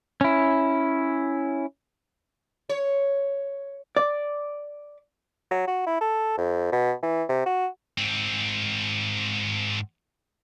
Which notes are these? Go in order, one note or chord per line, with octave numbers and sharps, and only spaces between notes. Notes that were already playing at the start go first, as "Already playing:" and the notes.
C#4 E4
C#5
D5
F#3
F#4
E4
A4
F2
B2
E3
C3
F#4
G#2 C4